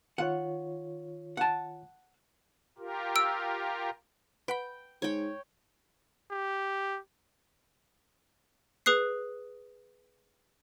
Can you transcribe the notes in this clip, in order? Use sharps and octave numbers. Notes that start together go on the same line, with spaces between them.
D#3 F4 C#5 F#5
F#5 A5
F4 G4 A#4
E6 D7
B4 F#5 G5 B5
G#2 C#5 G5
G4
G#4 B4 D#6 F#6 C7